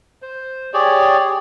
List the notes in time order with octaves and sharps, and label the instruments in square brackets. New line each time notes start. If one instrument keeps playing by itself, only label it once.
[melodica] C5
G4 G#4 C#5 D5